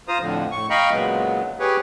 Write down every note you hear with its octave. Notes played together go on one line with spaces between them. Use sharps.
F4 C5 A#5 D#6
F2 A2 D3 F3
A2 C#6
D#5 F5 G5 A#5 B5 C#6
A#2 C#3 F#3 G#3 B3
G4 G#4 B4 C#5